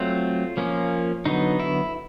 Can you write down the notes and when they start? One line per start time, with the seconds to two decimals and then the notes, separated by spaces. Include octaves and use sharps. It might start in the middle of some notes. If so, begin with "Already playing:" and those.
Already playing: F#3 A3 C4 F4
0.57 F3 A#3 C#4
1.25 D3 F#3 B3 D#4
1.59 E4